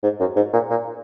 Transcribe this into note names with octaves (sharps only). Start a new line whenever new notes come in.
G#2
F#2
G#2
A#2
A#2